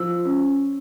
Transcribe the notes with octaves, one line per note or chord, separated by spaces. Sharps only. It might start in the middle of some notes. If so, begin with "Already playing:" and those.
Already playing: F3 E6
C#4